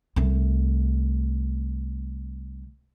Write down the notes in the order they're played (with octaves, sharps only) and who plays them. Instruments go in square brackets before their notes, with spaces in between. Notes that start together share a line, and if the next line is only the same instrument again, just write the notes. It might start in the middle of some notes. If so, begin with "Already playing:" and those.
[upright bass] C2 A3